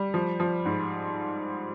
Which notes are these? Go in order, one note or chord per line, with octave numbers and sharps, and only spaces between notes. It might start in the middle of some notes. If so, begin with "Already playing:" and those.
Already playing: G3
F3
F3
G#2